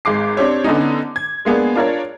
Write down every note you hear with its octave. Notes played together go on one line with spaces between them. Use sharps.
G#1 G#3 D6 C7
C4 D4 G4 C#5
D3 B3 C#4 D#4
G#6
G#3 A#3 B3 D4 G#4
D4 F4 A#4 C#5 D5